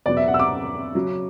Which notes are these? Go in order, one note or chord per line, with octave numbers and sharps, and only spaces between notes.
E2 B2 F#3 B3 D5
E5
F#5
E6
D6
C#3 F#3 C#4